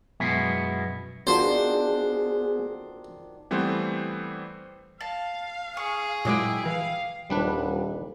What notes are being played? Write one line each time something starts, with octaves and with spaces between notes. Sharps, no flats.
F#2 B2 G#3 B3 E4
D3 D#3 B3 D4 F4 F#4 G#4 C5
E3 G3 A3 B3 C4 C5
F5 A5
G#4 C#6
A#2 F#3 G#3 E4 G5 D6 D#6
E3 F5
D#1 G3 D4 B4